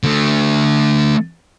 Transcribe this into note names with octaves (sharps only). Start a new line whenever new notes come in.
D3 A3